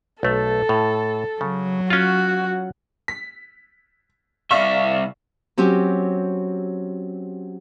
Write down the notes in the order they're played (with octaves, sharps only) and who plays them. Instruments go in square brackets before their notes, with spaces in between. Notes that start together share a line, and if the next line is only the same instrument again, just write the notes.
[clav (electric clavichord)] B1 A3 [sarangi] A4
[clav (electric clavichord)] A2
[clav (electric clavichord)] C#3 [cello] F#3
[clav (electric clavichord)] C#4 F4 [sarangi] F#4
[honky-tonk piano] B6
[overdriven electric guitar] C2 E5 [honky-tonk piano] D5 F5 C#6
[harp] F#3 C4 C#4 G4